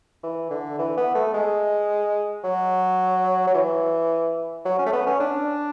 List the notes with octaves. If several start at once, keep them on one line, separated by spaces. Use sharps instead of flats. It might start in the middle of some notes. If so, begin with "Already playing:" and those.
E3
D3
E3
B3
A3
G#3
F#3
F#3
E3
F#3
C#4
A3
B3
C#4
D4